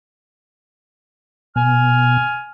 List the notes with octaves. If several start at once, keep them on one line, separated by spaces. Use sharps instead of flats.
B2 G#5 F6